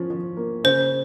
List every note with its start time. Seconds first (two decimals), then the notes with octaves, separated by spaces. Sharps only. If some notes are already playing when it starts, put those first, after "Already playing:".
Already playing: F3 C#4
0.10 F3
0.37 A#3
0.64 C#3 C5